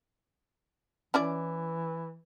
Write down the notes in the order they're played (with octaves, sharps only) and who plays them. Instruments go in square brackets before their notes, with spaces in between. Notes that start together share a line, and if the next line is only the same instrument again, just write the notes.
[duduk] E3 [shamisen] C#4 E4 D5